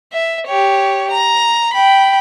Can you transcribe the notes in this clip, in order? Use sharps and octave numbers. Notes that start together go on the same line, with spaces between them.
E5
G4 C#5
A#5
G5 B5